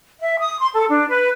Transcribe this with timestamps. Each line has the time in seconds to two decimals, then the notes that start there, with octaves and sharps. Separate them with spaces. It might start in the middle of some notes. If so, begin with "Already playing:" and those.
0.21 E5
0.40 D#6
0.59 C6
0.73 A4
0.90 D4
1.09 B4